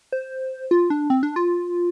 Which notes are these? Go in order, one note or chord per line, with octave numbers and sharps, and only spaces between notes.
C5
F4
D4
C4
D4
F4